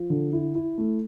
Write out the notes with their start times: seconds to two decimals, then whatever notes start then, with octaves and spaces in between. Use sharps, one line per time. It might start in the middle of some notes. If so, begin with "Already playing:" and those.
Already playing: F3
0.10 D3
0.33 E4
0.55 E4
0.78 A3